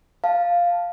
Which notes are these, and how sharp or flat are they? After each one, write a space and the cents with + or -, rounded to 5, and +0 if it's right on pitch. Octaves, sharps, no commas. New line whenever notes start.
F5 +0 A5 +0